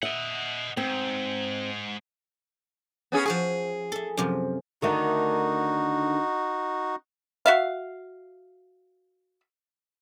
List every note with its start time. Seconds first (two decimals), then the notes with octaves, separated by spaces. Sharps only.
0.03 D#5 E5 F#5
0.77 G#2 C4
3.12 B3 C#4 G#4
3.26 F3 F#4 G#4 G#5
3.92 A4 E5
4.17 F#2 C3 F3
4.82 D3 D#3 A3 D#4 F#4
7.46 F#4 E5 F5